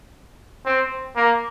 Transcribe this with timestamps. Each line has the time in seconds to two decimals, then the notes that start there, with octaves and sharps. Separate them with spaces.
0.66 C4
1.16 A#3